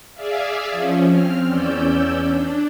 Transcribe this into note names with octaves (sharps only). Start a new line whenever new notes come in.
G#4 D5 E5 F5
F3 C#4
C4 F6
E2 C#4 D5 E6 G6
D4